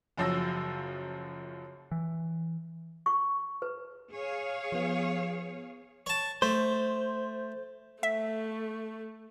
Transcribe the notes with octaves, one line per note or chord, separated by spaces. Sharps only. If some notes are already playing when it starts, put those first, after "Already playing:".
F#1 F#2 F3 F#3 E6 A#6
E3
C#6
B4
G#4 C#5 F5
F3 B3
C#5 A5
A3 C5
A3 E5